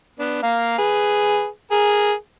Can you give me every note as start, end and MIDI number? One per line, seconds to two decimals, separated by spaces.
0.19 0.39 59
0.19 0.39 62
0.43 0.74 58
0.43 0.74 77
0.78 1.46 68
0.78 1.46 71
1.71 2.12 68
1.71 2.12 70